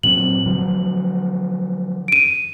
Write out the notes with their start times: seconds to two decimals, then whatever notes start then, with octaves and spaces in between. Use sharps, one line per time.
0.03 A#2 F#3 C4 F#7
0.46 D3 F3 F#3
2.08 D7 D#7